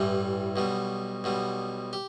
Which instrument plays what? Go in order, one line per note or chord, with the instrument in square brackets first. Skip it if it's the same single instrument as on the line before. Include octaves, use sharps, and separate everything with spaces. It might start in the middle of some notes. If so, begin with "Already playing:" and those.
Already playing: [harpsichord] A1 G2 E3 G3
B1 B2 G3
B1 B2 G3
G4